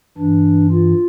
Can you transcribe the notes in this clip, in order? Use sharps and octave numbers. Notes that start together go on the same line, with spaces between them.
G2 E3 D4
F4